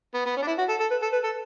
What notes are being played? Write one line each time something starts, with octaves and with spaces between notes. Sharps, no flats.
B3
B3
C#4
D4
E4
F#4
A4
A4
B4
A4
B4
A4